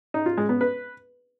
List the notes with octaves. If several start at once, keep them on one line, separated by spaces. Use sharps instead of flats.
D#4
F4
G#3
B3
B4